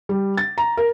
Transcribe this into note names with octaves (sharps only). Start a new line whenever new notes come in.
G3
A6
A#5
A#4